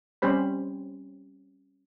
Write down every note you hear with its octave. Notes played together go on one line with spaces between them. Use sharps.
G3 C4 C#4 G4 C5 B5